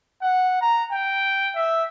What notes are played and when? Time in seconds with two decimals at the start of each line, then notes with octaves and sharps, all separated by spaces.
0.22 F#5
0.61 A#5
0.92 G5
1.56 E5